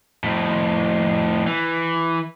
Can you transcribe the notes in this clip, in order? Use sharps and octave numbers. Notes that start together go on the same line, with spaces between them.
F2 A2
E3